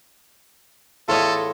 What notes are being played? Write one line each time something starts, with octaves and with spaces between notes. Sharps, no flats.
E2 A2 F4 A4 C#5 D#5